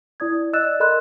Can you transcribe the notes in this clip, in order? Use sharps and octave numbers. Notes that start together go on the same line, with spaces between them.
E4 D5 D#6 G#6
D5 D#5 E6 F#6 A6 E7
A4 A#4 D#5 B5 C6 F#6